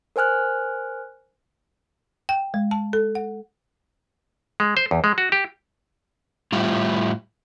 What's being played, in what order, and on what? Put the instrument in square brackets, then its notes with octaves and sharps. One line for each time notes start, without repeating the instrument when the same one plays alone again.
[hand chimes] A#4 C5 G#5 F6 F#6
[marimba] G5
G#3
A5
A4
F#5
[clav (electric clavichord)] G#3
C5
E2
G#3
F#4
G4
[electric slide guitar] A2 G3 E4 F4